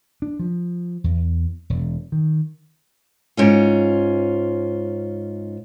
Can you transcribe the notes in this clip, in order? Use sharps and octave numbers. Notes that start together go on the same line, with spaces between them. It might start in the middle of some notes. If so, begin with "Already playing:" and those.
D4
F3
E2
E1
D#3
G#2 C#4 F4